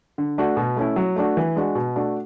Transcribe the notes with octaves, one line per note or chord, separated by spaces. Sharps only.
D3
A3 D4 F#4
B2
A3 C#4 E4
F#3
A3 D4 F#4
E3
G#3 D4 F#4
B2
A3 D4 F#4